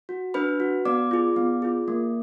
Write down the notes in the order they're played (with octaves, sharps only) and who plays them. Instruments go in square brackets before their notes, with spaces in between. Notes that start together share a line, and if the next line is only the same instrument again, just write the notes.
[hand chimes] F#4
D4 B4 B5
F#4
B3 D5 D6
F4 G#4
B3
F4 G#4
A#3